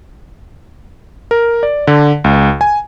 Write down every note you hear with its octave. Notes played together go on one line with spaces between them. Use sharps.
A#4
D5
D3
C#2
G#5